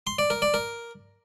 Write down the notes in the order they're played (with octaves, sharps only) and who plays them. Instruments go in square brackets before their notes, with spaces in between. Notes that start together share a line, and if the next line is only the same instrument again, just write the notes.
[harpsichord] C6
D5
A#4
D5
A#4